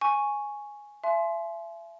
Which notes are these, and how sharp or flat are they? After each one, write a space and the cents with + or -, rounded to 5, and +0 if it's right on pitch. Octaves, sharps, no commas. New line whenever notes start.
G#5 +0 C#6 +0
E5 +35 G#5 +40 C6 +0